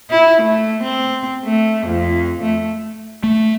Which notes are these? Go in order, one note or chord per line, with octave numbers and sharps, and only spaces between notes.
E4
A3
C4
A3
F2
A3
A3